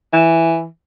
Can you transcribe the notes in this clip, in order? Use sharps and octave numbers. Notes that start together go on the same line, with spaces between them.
E3